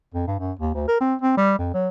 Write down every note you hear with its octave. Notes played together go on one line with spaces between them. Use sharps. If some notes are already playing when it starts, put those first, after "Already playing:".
F2
G2
F#2
D#2
D2
A#4
C4
C4
G3
F2
F#3